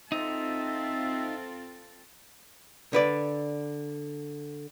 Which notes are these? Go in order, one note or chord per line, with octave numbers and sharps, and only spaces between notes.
C4 D#4 F4 A4 E5
D3 B4 D5